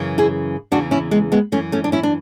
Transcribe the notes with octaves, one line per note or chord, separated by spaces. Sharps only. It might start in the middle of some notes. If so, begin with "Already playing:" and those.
Already playing: F#2 C#3 E3
E4 G#4
E2 C#3 E3 D4 F#4
C#4 E4
G#3 B3
G#3 B3
F#2 E3 A3 C#4
A3 C#4
D4
C#4 E4
D4